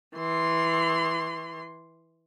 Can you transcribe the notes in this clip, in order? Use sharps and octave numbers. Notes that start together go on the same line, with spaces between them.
E3 C6